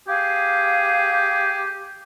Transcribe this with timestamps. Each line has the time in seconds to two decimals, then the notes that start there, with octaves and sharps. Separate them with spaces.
0.08 G4 G#4 F5